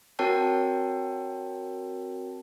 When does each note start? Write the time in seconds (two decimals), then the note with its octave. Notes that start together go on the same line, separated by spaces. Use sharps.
0.19 C4 F#4 A#4 C#5 G5 A5